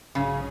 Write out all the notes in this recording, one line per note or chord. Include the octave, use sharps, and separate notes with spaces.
A#1 G#2 C#3 F#3 C#4 G#4